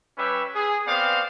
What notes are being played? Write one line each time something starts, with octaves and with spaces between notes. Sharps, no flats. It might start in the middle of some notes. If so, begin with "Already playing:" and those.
G3 C#4 G4 B4 E5
G#4
B3 C4 C5 D5 F5